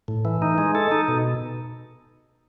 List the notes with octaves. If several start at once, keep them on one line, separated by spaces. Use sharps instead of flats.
A2
E3
D#4
G#3
A4
D#4
B2